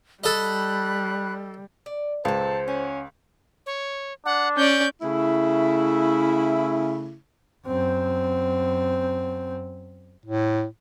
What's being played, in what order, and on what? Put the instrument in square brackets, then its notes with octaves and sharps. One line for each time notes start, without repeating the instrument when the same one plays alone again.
[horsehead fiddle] G3 [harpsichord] A4 D#5 [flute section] B5 F#6
[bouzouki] D5
[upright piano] C#2 [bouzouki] A#2 A4 [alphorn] C5 [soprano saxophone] A5
[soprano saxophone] C#4 [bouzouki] F#5
[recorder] C#5
[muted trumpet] D4 [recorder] F#5
[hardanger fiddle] C#4 D5 [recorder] G6
[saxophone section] C#3 A3 E4
[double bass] F#2 C4
[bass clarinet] A2